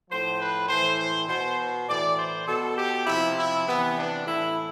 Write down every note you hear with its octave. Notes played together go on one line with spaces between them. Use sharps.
A2 F3 C5
B4
A2 E3 C5
C5
B2 C5
A2 E3 D5
C5
B2 A4
G4
C3 F3 E4
E4
C3 E3 B3
D4
A2 E3 E4